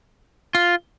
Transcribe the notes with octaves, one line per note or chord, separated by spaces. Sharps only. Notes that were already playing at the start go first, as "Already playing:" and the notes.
F4